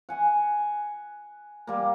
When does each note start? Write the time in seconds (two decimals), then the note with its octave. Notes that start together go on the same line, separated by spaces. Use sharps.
0.09 F#5 G#5
1.67 G3 A#3